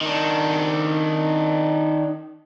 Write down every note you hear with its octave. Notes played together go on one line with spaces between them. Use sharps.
D#3 D4